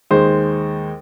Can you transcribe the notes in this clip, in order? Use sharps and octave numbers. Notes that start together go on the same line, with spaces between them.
D#2 G#3 C5